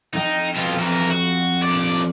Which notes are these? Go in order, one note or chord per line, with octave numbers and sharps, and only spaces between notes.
F2 D#4 G5
B2 F4
E3 A#4
F#4
F3 D5